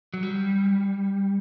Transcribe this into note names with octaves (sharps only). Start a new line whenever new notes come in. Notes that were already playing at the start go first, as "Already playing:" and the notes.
F#3
G3